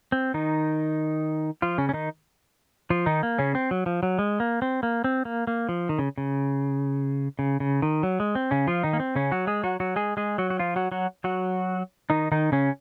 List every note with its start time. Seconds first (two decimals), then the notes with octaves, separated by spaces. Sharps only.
0.12 C4
0.34 D#3 D#4
1.62 F3 F4
1.78 C#3 C#4
1.89 C#4
1.94 D#3 D#4
2.90 F3 F4
3.06 D#3 D#4
3.23 A#3
3.39 C#3 C#4
3.55 C4
3.71 F#3
3.86 F3
4.03 F#3
4.19 G#3
4.40 A#3
4.62 C4
4.83 A#3
5.04 C4
5.25 A#3
5.47 A#3
5.69 F3
5.89 D#3
5.99 C#3
6.18 C#3
7.39 C#3
7.60 C#3
7.82 D#3
8.03 F#3
8.20 G#3
8.35 C4
8.51 C#3 C#4
8.67 F3 F4
8.83 D#3 D#4
8.93 A#3
9.00 C4
9.16 C#3 C#4
9.32 F#3 F#4
9.47 G#3 G#4
9.63 F#3 F#4
9.80 F#3 F#4
9.96 G#3 G#4
10.17 G#3 G#4
10.38 F#3 F#4
10.50 F#4
10.59 F3 F4
10.76 F#3 F#4
10.92 F#3 F#4
11.24 F#3 F#4
12.10 D#3 D#4
12.32 D#3 D#4
12.52 C#3 C#4